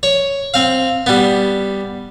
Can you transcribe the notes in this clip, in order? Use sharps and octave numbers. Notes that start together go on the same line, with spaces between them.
C#5
C4 F5
G3 B3